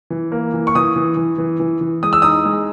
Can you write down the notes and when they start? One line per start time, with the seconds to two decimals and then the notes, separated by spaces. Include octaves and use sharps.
0.10 E3
0.32 A#3
0.54 E3
0.67 C#6
0.75 E3 D#6
0.96 E3
1.17 E3
1.38 E3
1.60 E3
1.81 E3
2.03 G#3 D#6
2.13 E6
2.22 D#4 D#6
2.45 G#3